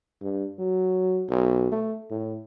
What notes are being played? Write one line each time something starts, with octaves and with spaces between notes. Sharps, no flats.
G2
F#3
B1
A3
A2